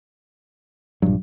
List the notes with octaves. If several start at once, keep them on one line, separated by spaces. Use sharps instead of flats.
A#1 G2 F#3